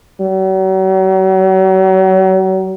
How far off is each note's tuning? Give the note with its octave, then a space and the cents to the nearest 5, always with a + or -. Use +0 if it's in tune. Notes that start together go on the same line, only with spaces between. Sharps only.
F#3 +40